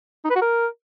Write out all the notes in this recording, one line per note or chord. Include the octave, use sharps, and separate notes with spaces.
D#4
B4
F#4
A#4